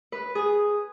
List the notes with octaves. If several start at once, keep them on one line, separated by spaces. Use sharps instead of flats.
B4
G#4